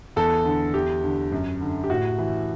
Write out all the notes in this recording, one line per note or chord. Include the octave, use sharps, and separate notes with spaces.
E2 A4
D3
E2 G4
D3
F#2
D3
G4
A2 F#4
E3